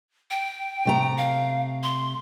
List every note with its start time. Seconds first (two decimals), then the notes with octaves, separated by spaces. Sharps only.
0.31 G5
0.85 C3 A3 A#5
1.17 F5
1.83 C6